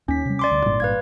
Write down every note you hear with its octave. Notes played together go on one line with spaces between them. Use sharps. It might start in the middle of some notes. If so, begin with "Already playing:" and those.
D#2 C#4 B6
C3 G3
D5 C6 D6
D2
G#1 G2 A#2
B4 F5 G#6